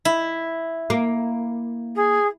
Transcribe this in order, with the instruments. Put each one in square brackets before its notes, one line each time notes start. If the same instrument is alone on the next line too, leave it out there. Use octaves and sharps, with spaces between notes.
[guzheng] E4
[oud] A#3
[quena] G#4